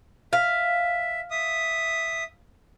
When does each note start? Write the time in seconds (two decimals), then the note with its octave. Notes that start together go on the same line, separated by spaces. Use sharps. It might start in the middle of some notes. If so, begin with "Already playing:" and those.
0.33 E5 F5
1.31 E5 D#6